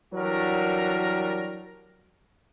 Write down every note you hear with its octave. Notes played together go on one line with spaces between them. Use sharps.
E3 F#3 G3 D4 F#4 A#4